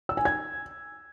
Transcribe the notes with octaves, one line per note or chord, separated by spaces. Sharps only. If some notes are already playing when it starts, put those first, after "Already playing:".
E6
G#5
G#6